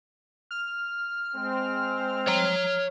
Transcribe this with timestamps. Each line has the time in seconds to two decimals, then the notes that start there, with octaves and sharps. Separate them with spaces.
0.51 F6
1.36 G#3 C4
2.27 C#5 A#5